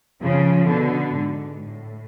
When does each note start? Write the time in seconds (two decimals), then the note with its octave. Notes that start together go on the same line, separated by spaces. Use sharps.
0.22 C#3 F3
0.68 B2 D3
1.15 G#2
1.62 A2